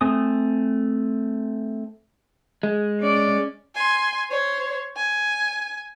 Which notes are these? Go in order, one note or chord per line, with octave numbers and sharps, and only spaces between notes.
A3 C4 G#5 D#6
G#3
C#4 D5
G#5 C6
C5 C#5
G#5